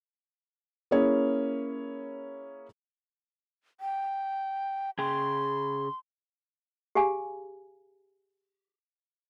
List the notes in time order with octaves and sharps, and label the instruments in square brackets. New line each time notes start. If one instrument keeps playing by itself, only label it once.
[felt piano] A#3 C#4 E4 G#4 C#5
[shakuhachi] G5
[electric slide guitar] C#3 G#4 G5 [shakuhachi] C6
[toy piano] G4 G#4 F5 G#5 A#5